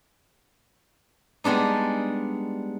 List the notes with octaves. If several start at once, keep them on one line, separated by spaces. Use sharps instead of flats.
G3 G#3 B3 D4 D#4